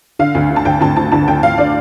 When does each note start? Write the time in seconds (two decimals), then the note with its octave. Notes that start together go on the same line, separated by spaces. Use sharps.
0.19 D3 F5
0.35 D2
0.51 D3
0.56 A5
0.65 D2 G5
0.81 D2 A5
0.97 D3 A5
1.12 D2 A5
1.28 D2 G5
1.43 D2 F5
1.58 D3 D5